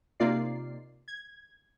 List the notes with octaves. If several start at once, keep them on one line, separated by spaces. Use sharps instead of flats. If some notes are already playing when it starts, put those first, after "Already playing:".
C3 A#3 D#4 F4 D5 C7
G#6